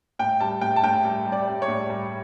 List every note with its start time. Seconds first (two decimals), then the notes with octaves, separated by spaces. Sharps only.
0.19 A2 G5
0.40 G3 A5
0.61 A2 G5
0.76 A5
0.83 A2 G5
1.04 G3
1.26 G3
1.32 D5
1.48 G3
1.62 C#5
1.68 A2
1.90 G3